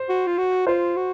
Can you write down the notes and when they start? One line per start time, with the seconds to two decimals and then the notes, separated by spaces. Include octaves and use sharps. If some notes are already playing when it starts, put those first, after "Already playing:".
Already playing: C5
0.09 F#4
0.27 F4
0.38 F#4
0.67 F4 C5
0.97 F#4